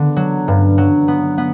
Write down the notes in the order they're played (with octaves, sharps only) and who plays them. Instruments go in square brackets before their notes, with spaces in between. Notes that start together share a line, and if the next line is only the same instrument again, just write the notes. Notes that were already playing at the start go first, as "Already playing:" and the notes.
Already playing: [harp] D3 B3
F#3
G2
F#3
B3
B3